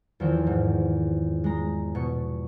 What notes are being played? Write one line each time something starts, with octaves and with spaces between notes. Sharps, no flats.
E2 D#3 F3 C4
G#2
G#3 A#5
B2 C#6